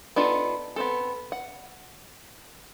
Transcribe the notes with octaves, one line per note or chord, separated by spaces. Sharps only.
B3 D4 D#4 F4 A4
B3 C4 A4
F#5